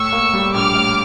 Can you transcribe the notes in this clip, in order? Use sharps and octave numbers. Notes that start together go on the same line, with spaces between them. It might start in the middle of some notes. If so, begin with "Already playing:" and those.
Already playing: A2 C#6 E6
A#3
G3
A#1 D6 F6
A2